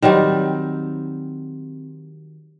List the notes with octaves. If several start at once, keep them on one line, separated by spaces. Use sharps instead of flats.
D#3 F#3 G3 C4